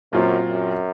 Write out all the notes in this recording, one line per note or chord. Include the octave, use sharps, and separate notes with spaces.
F#2 A#2 F#3 C4 F4
F#2